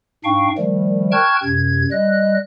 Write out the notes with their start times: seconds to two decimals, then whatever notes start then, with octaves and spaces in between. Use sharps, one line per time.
0.24 G#2 D4 F5 G5 C#6
0.58 D#3 F3 G3 A3
1.12 G5 A5 C#6 F6 F#6 G#6
1.43 F#2 C3 G#6
1.91 G3 D#5 F#6